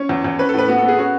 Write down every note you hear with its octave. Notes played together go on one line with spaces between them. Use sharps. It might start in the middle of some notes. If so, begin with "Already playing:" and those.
Already playing: C#4 C#5
E2
E2
C#4 B4
A4
A2 B4
B3 F#4
A4
B3
G#4
C#4 F#4